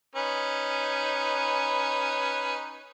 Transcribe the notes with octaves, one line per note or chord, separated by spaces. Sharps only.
C#4 D#4 B4